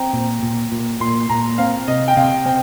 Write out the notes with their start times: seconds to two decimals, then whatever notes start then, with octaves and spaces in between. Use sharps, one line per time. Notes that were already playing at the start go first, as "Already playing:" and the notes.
Already playing: C4 G5 A#5
0.13 A#2
0.42 A#2
0.72 A#2
1.00 A#2 C6
1.30 A#2 A#5
1.58 C4 F5
1.88 C3 D#5
2.08 G5
2.17 C3 F5
2.46 C4 G5